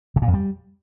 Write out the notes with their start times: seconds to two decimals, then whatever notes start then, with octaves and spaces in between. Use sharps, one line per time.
0.16 C#3
0.22 A#2
0.28 F2
0.34 G3